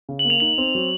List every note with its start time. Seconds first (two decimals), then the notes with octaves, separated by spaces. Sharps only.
0.09 C#3
0.19 F#7
0.25 A#3
0.30 F7
0.40 D#4 F#7
0.58 C4
0.75 F#3